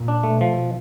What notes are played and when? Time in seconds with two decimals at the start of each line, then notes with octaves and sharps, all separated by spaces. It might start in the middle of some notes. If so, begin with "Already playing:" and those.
Already playing: A#2
0.08 D4
0.23 B2 A3
0.41 F3